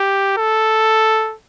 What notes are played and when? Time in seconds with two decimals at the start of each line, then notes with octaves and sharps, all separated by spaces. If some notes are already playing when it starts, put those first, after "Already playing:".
Already playing: G4
0.38 A4